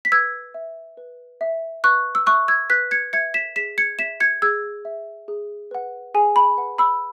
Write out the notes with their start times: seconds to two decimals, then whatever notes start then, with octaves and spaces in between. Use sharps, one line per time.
0.05 B6
0.12 B4 E6 G#6
0.54 E5
0.97 B4
1.41 E5
1.84 B4 C#6 F#6
2.15 E6
2.27 E5 C#6 F#6
2.48 E6 G#6
2.70 B4 F#6 B6
2.91 G#6 C#7
3.13 E5 G#6 C#7
3.34 B6 E7
3.56 G#4 B6 E7
3.78 G#6 C#7
3.99 E5 B6 E7
4.20 G#6 C#7
4.42 G#4 E6 G#6
4.85 E5
5.28 G#4
5.71 B4 F#5
6.14 G#4 G#5
6.36 B5
6.57 B4 F#5
6.78 B5 E6